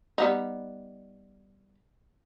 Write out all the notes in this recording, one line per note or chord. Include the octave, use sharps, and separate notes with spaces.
G3 B3 D#4